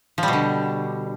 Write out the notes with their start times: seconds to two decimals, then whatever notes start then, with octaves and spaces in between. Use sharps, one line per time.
0.18 F3
0.23 G3
0.28 B2
0.33 D3